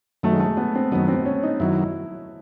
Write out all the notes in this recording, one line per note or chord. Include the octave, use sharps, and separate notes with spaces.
F#2 D#3 F#3 A3
G#3
A3
B3
C4
F#2 D#3 F#3 B3
C4
C#4
D#4
F#2 D#3 F#3 E4